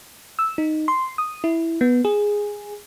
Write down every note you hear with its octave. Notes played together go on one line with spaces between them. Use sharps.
E6
D#4
C6
D#6
E4
B3
G#4